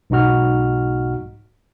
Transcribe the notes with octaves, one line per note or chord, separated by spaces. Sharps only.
B1 G#2 D#4 F#4 F6